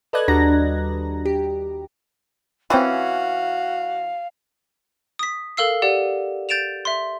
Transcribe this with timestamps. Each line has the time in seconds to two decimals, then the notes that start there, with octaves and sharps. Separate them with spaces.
0.13 A4 B4 D5 D#5 F#6 G#6
0.28 D#2 G3 D4 F#4 A#5 A#6
1.25 G4
2.70 E3 C4 C#4 F4 F#4 F5
5.19 D#6 B6
5.57 A4 A#4 F5 E6 C7
5.82 G4 D5 F#5
6.49 G6 A6 D7 E7 F7
6.85 E5 C6